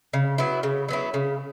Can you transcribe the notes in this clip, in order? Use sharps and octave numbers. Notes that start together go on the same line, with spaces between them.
C#3
F#3 B3 E4
C#3
F#3 B3 E4
C#3